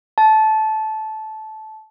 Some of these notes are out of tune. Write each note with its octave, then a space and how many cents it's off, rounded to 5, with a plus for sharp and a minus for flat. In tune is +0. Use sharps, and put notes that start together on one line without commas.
A5 -15